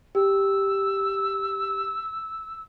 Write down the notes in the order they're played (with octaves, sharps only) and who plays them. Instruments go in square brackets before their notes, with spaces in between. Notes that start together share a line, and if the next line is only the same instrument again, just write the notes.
[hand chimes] G4 [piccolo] E6